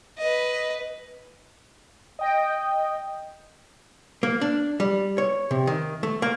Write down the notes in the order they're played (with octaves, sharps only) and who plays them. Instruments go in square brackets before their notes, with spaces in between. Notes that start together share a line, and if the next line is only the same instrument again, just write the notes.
[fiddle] B4 D#5
[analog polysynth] D#5 G5
[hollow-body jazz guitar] A#3
D4
G3
C#5
C3
D#3
A3
A#3